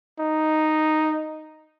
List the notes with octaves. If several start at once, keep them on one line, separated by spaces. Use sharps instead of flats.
D#4